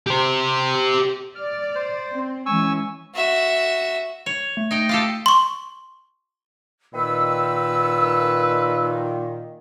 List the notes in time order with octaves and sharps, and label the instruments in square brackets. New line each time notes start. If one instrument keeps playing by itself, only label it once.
[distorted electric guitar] G4 C5
[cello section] D5 [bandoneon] F6
[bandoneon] C5
[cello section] C4
[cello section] E3 G#3 C#4 [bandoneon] G#5 C#6 E6
[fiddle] F#4 E5
[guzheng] C#5
[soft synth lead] A3
[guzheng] D#4 G5
F4 G4 A4
[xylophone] C6 C#6
[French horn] A#2 [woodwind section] D#3 [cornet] B4 [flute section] E6